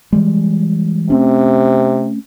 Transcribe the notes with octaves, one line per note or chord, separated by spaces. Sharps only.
E3 G3 G#3
C3 A3 C4 C#4